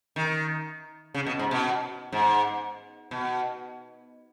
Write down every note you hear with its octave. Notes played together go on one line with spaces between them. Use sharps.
D#3
C#3
B2
G#2
B2
G#2
B2